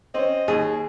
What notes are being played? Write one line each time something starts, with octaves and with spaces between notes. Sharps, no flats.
C4 C#4 D#5
D#2 G#4